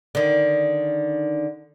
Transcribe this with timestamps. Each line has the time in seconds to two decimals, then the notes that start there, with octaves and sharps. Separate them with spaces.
0.15 D3 D#3